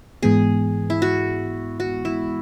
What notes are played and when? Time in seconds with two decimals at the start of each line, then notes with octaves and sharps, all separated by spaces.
0.23 G#2 E3 G#3 B3 G#4
0.90 E4
1.02 F#4
1.80 F#4
2.05 E4